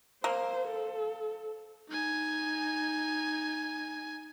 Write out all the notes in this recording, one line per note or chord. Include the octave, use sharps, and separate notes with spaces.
A#3 C5
A4
D#4 G#5